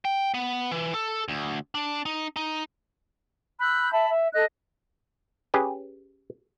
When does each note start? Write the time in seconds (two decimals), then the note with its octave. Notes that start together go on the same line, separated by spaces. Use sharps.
0.05 G5
0.34 B3
0.71 E3
0.94 A4
1.28 D2
1.75 D4
2.06 D#4
2.36 D#4
3.60 B5 E6 F#6 G6
3.92 E5 A5 B5
4.10 E5
4.34 A4 D#5 F#6
5.54 C#4 G4 G#4 B4